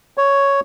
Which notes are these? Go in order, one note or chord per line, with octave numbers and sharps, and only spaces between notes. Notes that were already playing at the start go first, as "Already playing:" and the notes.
C#5